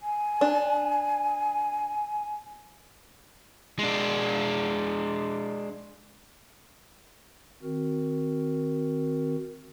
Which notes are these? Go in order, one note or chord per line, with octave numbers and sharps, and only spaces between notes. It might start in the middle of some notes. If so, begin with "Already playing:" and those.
G#5
D4
G#3 D4
D#3 C4 F#4 A#4